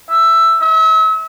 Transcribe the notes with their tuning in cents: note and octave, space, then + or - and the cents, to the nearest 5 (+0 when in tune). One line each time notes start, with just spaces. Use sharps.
E5 +10
E5 -40